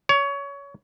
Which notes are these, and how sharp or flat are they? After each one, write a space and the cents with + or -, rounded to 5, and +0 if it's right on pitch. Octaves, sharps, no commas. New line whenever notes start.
C#5 +25